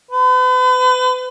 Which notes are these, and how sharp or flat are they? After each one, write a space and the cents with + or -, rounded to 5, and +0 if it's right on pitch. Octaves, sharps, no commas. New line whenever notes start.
B4 +40